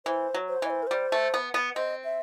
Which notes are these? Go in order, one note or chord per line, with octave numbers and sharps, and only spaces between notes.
E3 C5
F#3
C5
E3 D#5
C5
A#4
G3 C5
A3
B3
B3
C4 D#5
E5